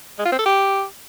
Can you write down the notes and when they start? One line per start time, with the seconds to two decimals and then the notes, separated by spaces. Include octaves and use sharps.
0.19 G#3
0.25 F4
0.32 C4
0.39 A4
0.45 G4